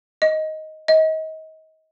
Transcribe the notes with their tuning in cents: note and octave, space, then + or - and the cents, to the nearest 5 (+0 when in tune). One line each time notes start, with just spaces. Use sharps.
D#5 +10
D#5 +30